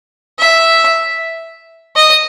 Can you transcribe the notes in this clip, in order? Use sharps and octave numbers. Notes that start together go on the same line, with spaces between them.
E5
D#5